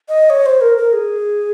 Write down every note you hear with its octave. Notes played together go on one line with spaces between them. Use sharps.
D#5
C#5
C5
A#4
A#4
G#4